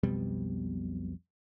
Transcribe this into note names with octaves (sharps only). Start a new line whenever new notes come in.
B1 F2 B2 G3